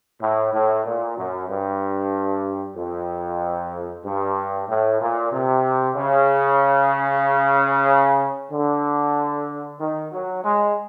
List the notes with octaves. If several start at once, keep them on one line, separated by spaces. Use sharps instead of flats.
A2
A2
A#2
F#2
G2
F2
G2
A2
A#2
C3
C#3
D3
D#3
F#3
G#3